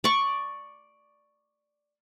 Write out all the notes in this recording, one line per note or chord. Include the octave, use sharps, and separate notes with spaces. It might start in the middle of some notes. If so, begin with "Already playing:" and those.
D5 C#6